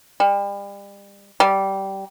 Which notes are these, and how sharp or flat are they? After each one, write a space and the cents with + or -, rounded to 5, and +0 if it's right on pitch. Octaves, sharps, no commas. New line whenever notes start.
G3 +35
G3 -15